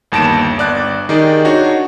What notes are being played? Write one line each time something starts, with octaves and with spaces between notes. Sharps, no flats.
G1 D#2 A5 A#6 D7 E7
G1 D5 F#6
D#3 D#4 G4 G#4 D5
D4 D#4 F#4 C#5